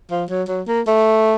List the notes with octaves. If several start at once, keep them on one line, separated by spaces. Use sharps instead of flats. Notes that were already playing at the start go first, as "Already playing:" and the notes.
F3
F#3
F#3
A#3
A3